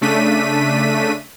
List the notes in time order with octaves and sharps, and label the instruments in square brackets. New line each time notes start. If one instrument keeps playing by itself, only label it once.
[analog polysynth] C#3 A3 D4 B6 D#7